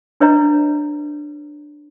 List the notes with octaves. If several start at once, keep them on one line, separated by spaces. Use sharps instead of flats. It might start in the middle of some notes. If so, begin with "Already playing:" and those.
D4 B4 C#5 D#5 A#5